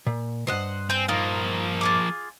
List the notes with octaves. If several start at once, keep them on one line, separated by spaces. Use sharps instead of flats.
A#2
B1 G2 C5 D#5 F#5
C4 G#5 G6
F3 A#3 D#4 F4
F4 G#4 D6